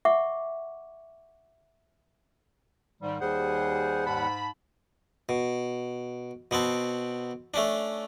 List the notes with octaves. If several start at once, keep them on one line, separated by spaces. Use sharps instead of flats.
E5 F#5 C#6 D6
G#2 D#3 G3
D#2 G3 G#4 C5 F#5
G#2 A5 B5
B2
B2 B3 C4 A5
A3 C#4 D4